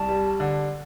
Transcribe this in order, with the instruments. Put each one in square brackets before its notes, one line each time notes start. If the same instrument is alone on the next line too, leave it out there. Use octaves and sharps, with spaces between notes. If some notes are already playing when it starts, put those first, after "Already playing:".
Already playing: [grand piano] C2 [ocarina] A5
[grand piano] G3
D3